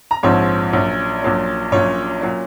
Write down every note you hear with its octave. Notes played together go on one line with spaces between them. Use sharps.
A#5
A#1 G#2 F3 C4 C#5
A#1 A#2 F#3 C#4
A#1 A#2 F#3 C#4
A#1 A#2 F#3 C#4 C#5
A#2 F#3 C#4